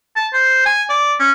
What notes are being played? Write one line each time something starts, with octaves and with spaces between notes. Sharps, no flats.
A5
C5
G#5
D5
C#4